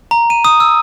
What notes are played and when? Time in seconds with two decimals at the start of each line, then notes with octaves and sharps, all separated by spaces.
0.11 A#5
0.30 D#7
0.45 D#6
0.60 E6